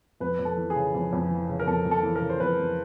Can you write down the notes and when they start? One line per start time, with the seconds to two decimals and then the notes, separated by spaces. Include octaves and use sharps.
0.20 F2 B4
0.39 F2
0.45 A4
0.57 E3
0.70 G#4
0.75 C#3
0.95 F2
1.13 F2
1.31 E3
1.49 C#3
1.59 A#4
1.67 F2 A4
1.85 F2
1.91 A4
2.03 E3
2.16 A#4
2.21 C#3
2.30 C5
2.40 F2 B4
2.59 F2